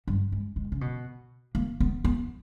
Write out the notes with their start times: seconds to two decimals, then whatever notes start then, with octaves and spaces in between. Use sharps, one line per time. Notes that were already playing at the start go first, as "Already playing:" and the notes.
0.07 G2
0.32 G#2
0.56 G#2
0.72 C#3
0.81 B2
1.55 A#3
1.80 B3
2.04 B3